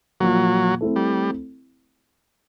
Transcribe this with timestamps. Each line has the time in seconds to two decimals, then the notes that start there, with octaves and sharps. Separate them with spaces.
0.20 A#2 F3 F#3 A#3
0.81 A3 C4 E4 A4
0.96 G3